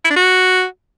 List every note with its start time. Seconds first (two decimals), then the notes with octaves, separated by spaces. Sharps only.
0.05 E4
0.10 D4
0.16 F#4